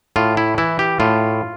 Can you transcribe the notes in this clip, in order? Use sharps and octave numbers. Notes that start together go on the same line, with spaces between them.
A2 F4
E4
E3 E4
G4
A2 F4